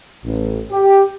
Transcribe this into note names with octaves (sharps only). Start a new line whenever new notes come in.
A1
G4